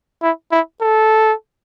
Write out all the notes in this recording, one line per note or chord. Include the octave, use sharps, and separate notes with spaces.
E4
E4
A4